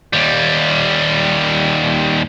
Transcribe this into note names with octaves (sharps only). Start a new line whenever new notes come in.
D#2 G3